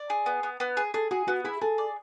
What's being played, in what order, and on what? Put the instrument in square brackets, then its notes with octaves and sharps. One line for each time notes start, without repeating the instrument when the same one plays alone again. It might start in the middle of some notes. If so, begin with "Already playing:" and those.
Already playing: [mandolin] D5
G#4
B3
B3
B3
G#4
[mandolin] G#4 [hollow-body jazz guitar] A4
[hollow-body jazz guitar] F#4 [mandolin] G#4
[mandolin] B3 [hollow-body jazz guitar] F#4
[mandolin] E4 [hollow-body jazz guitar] G#4
[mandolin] G#4 [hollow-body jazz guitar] A4
[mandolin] D5